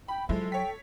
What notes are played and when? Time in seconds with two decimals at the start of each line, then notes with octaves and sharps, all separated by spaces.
0.08 G5 B5
0.29 F3 F#3 G#3 E4 A4
0.52 C#5 G5 B6